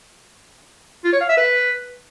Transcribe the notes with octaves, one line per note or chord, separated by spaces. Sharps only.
F4
C#5
F5
E5
B4